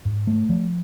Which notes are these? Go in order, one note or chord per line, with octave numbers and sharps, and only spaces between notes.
G#2
A3
F3